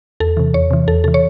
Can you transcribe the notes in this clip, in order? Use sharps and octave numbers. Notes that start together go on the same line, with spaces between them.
E2 A4
C3 E3
E2 C#5
C3 E3
E2 A4
C3 E3 A4
C#5